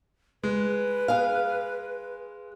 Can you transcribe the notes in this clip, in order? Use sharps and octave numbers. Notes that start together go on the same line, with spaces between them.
G#3 B4
G#4 F5